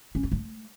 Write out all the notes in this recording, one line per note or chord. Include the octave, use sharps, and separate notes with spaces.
C#4
F4
A3